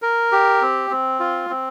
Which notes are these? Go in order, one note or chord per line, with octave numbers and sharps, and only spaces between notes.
A#4
G4
C4
C4
F4
C4